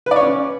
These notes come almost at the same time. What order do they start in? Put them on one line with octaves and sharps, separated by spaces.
B4 D5 C#5 C#4